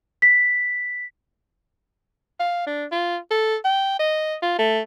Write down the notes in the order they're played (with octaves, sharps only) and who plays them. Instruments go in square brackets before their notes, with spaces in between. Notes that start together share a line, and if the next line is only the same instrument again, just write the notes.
[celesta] B6
[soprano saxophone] F5
D4
F4
A4
G5
D#5
F4
A3